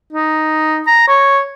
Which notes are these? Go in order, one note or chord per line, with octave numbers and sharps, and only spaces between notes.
D#4
A#5
C#5